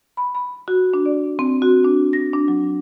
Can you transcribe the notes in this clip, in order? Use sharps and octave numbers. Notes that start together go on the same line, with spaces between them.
B5
B5
F#4
D4
D5
C4
F#4
D4
A#6
D4
F#3